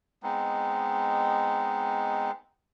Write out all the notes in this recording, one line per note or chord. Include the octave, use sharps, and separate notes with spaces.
G#3 B3 C4 D#4